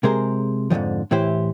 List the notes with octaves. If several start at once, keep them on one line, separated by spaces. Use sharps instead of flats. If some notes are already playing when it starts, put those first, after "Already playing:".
C3 G#3 G#4 A#4 C5
F2 G#2 D3 D#3 F3
A2 E3 E4 G4 C5